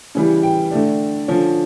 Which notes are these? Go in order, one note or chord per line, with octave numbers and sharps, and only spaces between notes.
C#3 E3 G3
G5
D3 A3 D4
D3 F3 C#4